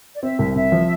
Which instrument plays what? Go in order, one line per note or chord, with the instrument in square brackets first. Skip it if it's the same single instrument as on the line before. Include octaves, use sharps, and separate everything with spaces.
[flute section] D5
[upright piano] C4 [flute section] E5
[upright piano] C2
[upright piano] C3 [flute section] E5
[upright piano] F3